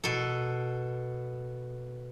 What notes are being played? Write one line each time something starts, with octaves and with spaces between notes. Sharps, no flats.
B2 A4